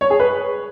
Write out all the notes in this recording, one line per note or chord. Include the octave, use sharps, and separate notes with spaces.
C#5
G#4
B4